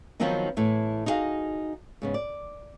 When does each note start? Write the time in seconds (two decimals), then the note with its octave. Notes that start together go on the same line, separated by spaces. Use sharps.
0.20 D#3 F3 F#3 B3 C4 D#4
0.57 A2 E3
1.06 D#4 E4 F#4 G#4 F5
2.02 G#2 C#3 B3
2.14 D5